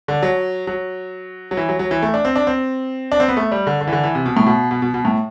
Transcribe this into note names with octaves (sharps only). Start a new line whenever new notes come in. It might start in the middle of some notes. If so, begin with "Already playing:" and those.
D3
F#3
F#3
F#3
E3
F#3
F#3
E3
A3
D4
C4
D4
C4
D4
C4
B3
A3
G3
D3
D3
E3
D3
E3
C3
B2
A2
B2
B2
B2
B2
A2